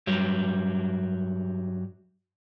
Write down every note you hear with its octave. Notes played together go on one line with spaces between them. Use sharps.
G2 F#3 G3